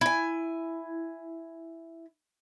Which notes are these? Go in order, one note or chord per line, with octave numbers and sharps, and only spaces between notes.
E4 G#5